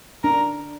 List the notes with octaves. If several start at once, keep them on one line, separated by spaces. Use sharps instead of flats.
D4 A#4